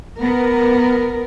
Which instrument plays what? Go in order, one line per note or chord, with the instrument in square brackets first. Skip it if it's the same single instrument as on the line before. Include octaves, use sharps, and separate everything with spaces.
[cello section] B3 A#4